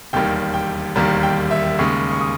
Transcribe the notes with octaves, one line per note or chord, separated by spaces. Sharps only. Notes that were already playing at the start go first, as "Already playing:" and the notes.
E1 D#2 D#3 G3 G5
G5
E1 D#2 D#3 G3 A#5
G5
E5
D#2 C#3 G#3 C#6
C#6
D#6